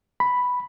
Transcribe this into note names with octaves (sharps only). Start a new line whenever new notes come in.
B5